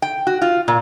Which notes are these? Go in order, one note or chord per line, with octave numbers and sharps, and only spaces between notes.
G5
F#4
F4
A#2